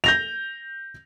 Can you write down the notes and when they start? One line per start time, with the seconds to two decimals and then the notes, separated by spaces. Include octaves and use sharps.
0.04 G6 A#6 F7